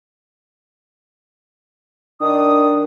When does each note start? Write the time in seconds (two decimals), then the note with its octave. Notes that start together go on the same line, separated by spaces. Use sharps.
2.21 D#3 D4 D#6